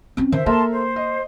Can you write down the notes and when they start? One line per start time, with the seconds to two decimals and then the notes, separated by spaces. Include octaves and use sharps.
0.17 C4 C#4
0.32 D#3 C5 E5
0.46 A#3 A4 A#4 E5 A5 C6
0.72 C5
0.96 D#5